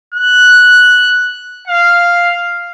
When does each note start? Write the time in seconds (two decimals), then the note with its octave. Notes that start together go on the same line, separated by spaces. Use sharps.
0.14 F#6
1.68 F5